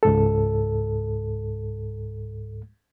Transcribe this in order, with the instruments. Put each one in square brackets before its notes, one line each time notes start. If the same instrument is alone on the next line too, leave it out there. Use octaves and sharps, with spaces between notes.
[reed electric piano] C#2 G#2 A4